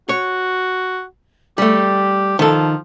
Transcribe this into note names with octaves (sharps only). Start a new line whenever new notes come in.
F#4 C#5
G3 A3 G4
D#3 F3 A4